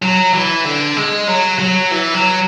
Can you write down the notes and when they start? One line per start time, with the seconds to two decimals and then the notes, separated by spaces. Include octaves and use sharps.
0.02 F#3
0.33 E3
0.65 D3
0.96 G#3
1.28 F#3
1.59 F#3
1.91 E3
2.14 F#3